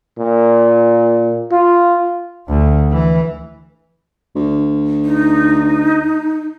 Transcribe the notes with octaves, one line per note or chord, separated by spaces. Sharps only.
A#2
F4
D2
E3
D2
D#4